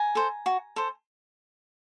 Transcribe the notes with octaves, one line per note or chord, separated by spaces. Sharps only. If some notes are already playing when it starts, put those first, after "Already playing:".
Already playing: G#5 A#5
A4 C5
F#4
A4 C5